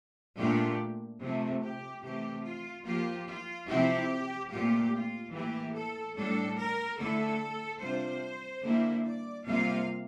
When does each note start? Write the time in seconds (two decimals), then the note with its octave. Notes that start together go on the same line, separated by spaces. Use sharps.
0.36 A#2 A3 D4 F4 G4
1.20 C3 F3 A3
1.61 G4
2.02 C3 E3 A3 G4
2.43 F4
2.84 F3 A#3 F4 G4
3.26 F4
3.67 C3 F3 C4 E4 G4
4.49 A#2 A3 C4 F4 G4
4.92 F4
5.32 A2 E3 A#3 E4 G4
5.74 A4
6.15 A2 G3 D4 A4
6.57 A#4
6.98 D3 A3 E4 A4
7.80 C3 G3 D4 F4 C5
8.63 D3 G3 A#3 E4
9.05 D5
9.45 C3 G3 A#3 F4 F5